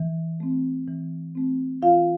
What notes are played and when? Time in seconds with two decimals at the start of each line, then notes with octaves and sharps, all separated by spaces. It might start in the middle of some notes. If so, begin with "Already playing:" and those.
Already playing: E3
0.40 A3 C4
0.87 E3
1.35 A3 C4
1.82 E3 F4 F5